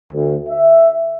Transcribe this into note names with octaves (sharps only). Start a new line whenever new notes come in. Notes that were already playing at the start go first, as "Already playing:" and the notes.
D2
E5